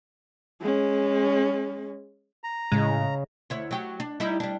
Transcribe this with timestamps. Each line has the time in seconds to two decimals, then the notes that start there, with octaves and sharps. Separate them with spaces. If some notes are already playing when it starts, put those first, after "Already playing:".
0.61 G#3 C#4
2.44 A#5
2.72 A2 C#3 G#3
3.50 D2 E4 C#5
3.71 F#3 G4
4.00 D4
4.20 G3 D#4 E4
4.40 G3 D4